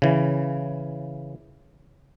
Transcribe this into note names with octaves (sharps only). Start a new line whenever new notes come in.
C#3 E3